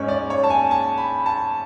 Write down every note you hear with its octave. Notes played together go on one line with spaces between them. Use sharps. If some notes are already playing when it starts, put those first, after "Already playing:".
Already playing: G#2 G#3 C#4 C#5
D5
C#5
A5
G#5
A5
B5
A5